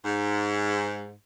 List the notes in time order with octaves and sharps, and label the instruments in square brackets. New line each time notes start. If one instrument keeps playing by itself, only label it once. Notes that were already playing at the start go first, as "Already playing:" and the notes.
[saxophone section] G#2